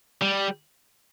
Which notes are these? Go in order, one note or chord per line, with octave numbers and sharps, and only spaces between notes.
G3